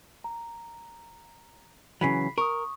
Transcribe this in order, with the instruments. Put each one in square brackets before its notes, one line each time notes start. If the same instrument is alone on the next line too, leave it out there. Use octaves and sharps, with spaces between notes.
[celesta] A#5
[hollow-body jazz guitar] C#3 E3 F#3 [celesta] B5 B6 C7
[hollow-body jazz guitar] A#4 [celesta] C#6 D#6